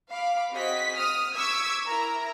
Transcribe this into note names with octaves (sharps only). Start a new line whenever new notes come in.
F5 B5 D6
C4 F#4 G#4 D#5 B6
D#6 F6
C#6 D6 E6 G#6 B6
E4 A#4 A#5